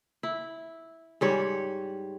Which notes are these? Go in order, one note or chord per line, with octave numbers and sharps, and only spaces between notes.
E4
G#2 G3 C#5